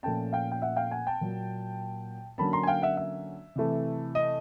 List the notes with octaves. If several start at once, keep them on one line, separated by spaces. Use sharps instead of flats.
A#2 F3 A3 C#4 G5 A5
F5 G5
G5
E5 F#5
F5 G5
F#5 G#5
G5 A5
A#2 F#3 A#3
D3 F#3 A#3 C#4 A5 B5
A#5 C6
G#5
F5 G5
E5 F#5
E5
C3 E3 A3
D#5